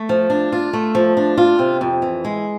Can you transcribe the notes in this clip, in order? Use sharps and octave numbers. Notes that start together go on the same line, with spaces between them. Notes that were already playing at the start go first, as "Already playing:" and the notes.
Already playing: A3
F3
D4
F4
A3
F3
D4
F4
C3
F2
E3
G#3